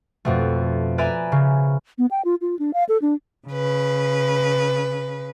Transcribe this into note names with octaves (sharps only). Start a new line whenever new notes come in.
F2 B2 A3
B4 D5 E5 G#5 A#5 B5
C#3
B3
G5
F4
F4
D4
F5
A4
D4
C#3 B4